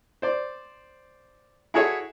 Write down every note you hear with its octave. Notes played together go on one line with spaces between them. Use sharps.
C5 D5
E4 F#4 G#4 A4 C#5 E5